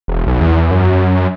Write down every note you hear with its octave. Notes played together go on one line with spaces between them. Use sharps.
E1
B1
E2
F#2